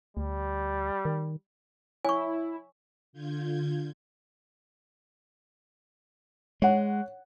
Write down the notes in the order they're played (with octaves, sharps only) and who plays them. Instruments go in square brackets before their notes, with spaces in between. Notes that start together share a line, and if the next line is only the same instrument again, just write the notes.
[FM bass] D2 [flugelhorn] G3
[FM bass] D#3
[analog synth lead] E4 [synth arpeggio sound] C#5 [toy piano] G#5 C#6
[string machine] D3 F4 G6 G#6
[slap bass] G#3 [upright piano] C#5 F#5